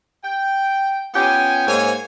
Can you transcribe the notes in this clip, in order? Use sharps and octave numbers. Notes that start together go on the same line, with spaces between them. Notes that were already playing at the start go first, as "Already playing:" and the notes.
G5
B3 C#4 F4 G5 G#5
G#2 A#3 C5 C#5 G#5